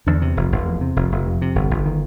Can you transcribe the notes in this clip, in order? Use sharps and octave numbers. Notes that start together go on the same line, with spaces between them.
E2 D3
C3
F1
F1
E2
C3
F1
F1
F2
C3
G1
G1
D#3